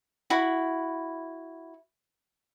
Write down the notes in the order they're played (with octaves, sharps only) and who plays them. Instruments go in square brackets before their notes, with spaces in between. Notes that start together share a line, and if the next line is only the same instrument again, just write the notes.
[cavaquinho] E4 F#4 B5